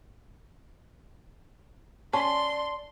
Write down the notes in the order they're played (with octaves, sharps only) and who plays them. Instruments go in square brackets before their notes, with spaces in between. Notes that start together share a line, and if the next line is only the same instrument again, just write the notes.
[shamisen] C#4 [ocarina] D5 [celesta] A5 [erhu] C6